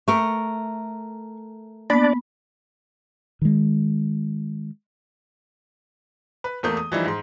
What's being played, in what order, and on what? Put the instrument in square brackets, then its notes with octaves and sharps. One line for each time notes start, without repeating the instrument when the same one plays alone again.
[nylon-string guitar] A3 A#4 [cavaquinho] C#6
[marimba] A#3 B3 [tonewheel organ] D4 D5 [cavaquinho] B5
[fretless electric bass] D#3 G#3
[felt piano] B4
E2 A3 A#3 D#6 G6
D#6
E3 F3 G3 D#4 E4
G#2 C6